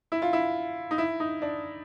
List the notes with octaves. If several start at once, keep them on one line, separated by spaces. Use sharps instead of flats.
E4
F4
E4
D#4
E4
D#4
D4